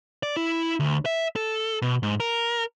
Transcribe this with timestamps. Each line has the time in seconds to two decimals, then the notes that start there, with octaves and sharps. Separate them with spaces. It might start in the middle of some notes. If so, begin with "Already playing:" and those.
0.23 D5
0.37 E4
0.80 D2
1.05 E5
1.36 A4
1.82 B2
2.03 G#2
2.20 A#4